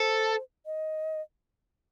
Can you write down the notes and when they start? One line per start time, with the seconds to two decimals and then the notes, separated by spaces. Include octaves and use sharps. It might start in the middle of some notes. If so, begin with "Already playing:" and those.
Already playing: A4 C5
0.66 D#5